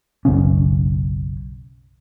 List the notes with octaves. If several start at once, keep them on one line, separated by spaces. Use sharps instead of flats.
F#1 B1 C#3 C#4